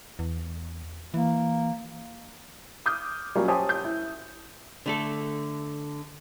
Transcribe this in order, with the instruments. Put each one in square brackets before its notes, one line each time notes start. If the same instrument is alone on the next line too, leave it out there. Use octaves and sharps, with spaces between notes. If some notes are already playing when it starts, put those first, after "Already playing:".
[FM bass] E2
[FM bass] E3 [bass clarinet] A#3
[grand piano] D6 D#6 F6 G6
F#3 G3 A#3 C#4 F4
G4 C5 C#5 G#5 A5 D#6
G6
E4
[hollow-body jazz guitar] D3 A3 A4